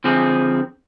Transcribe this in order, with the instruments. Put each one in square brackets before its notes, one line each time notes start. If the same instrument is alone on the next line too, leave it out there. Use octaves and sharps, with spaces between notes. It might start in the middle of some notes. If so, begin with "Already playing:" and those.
[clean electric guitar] D3 F3 C4 G#4